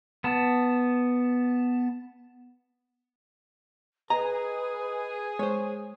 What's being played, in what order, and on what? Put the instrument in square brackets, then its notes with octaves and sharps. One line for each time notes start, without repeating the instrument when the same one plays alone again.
[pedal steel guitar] B3 A5
[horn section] G#4 [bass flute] B4 [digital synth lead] D#5 [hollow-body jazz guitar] A#5
[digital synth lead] G#3 [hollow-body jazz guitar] C5 C#5